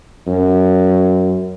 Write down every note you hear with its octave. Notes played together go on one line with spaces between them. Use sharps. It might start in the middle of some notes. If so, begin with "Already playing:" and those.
F#2